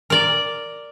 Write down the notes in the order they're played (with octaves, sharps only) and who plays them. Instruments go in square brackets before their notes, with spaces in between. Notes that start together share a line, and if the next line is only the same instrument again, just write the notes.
[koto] A#4 D5